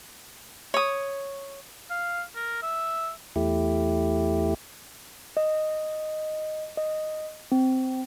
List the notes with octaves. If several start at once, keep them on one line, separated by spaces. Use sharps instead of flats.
C#5 D#6
F5
A#4
E5
E2 A3 E4 G4
D#5
D#5
C4